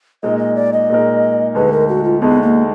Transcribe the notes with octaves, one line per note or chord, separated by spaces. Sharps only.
A#2 G#3 D#4 A#4 D#5
D#5
D5
D#5
A#2 G#3 D#4 A#4
D2 D3 G#3 D#4 B4
A#4
F#4
F4
D2 D3 G#3 B3 D#4
A#3